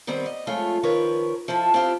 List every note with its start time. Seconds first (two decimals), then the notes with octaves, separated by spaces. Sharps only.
0.07 D#3 G3 B3 C4
0.26 D#5
0.47 F2 G#3 A3 F4 C#5
0.83 D#3 F3 A#4 B4 C#5
1.48 F3 E4 F4 A4
1.74 C4 E4 F4 G4